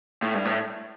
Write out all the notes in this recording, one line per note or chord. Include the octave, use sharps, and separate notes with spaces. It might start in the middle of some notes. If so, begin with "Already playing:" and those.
A2
G2
A2